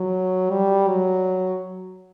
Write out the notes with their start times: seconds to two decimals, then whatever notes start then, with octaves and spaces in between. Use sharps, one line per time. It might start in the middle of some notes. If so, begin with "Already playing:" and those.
Already playing: F#3
0.50 G3
0.88 F#3